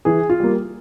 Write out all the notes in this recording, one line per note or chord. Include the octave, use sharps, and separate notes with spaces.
E3 G#4
F4
G3 A#3